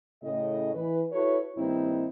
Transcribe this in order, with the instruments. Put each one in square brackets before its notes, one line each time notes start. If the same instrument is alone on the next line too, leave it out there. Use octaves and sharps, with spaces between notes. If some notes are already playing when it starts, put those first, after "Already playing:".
[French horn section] A2 C#3 D#5
E3 B4
E4 F#4 A4 B4 C#5
G2 D#3 A#3 C4 D#4 E4